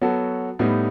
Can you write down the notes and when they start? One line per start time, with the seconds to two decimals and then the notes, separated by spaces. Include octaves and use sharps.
0.01 F#3 B3 F#4 A4
0.59 A2 G3 B3 D#4